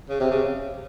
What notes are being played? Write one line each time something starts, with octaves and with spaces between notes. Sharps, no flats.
C#3
C3
C#3